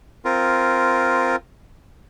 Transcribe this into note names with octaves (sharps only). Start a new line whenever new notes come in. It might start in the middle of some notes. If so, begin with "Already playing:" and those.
C4 F4 A#4